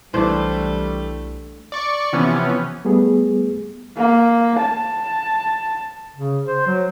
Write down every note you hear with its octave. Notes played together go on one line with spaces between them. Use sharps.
B1 E3 G3 A3 D4 C5
D5 C#6
C3 E3 F3 B3 C#4
G3 A3 B3 G#4
A#3
A5
C#3
C5
F#3